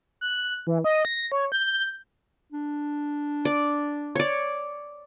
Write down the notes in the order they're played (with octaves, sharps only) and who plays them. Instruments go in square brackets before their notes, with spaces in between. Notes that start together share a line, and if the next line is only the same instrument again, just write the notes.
[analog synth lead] F#6
E3
D#5
A#6
C#5
G6
[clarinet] D4
[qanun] D5
C#5 D5